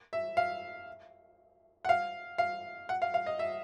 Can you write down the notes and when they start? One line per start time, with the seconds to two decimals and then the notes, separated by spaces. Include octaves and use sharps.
0.13 E5
0.37 F5
1.85 F#5
1.89 F5
2.38 F5
2.89 F#5
3.02 F5
3.14 F5
3.26 D#5
3.39 E5